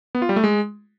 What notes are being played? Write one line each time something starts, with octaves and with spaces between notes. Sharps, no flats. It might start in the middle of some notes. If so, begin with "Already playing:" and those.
B3
F4
G3
A3
G#3